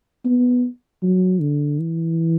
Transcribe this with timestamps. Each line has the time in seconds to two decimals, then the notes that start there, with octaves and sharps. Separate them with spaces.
0.25 B3
1.03 F#3
1.41 D3
1.79 E3